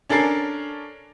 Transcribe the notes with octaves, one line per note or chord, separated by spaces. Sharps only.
C#4 D4 A4 A#4 A6 C7